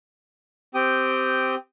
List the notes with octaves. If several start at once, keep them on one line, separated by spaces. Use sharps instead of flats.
C4 G4 G5 D#6